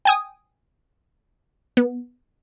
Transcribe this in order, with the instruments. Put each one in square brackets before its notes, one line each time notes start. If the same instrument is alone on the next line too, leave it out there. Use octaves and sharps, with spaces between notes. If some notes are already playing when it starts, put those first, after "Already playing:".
[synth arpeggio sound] G5 G#5 D#6
B3